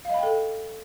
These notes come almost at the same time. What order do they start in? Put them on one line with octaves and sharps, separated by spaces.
F5 D#5 B5 G5 A4